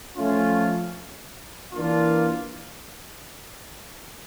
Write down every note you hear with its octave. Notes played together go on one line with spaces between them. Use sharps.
F3 A3 C#4 F4
E3 A#3 D4 F4